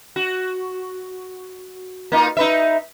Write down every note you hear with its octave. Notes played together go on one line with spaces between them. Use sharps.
F#4
A#3 D#4 F4
D#4 B4 E5